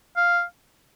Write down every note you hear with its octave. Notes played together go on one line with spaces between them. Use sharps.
F5